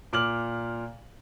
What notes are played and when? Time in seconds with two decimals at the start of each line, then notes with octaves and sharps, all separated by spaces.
0.13 A#2 D6 F6 F#7